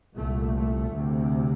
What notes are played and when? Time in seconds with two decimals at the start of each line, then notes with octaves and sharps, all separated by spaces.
0.14 C2 A#2 A3
0.55 A3
0.95 D2 C3